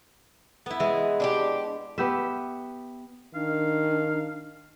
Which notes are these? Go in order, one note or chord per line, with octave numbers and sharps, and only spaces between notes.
B3 E4
E3 G#3
D4 F#4 G4
B3 G4 E5
D#3 D4 F5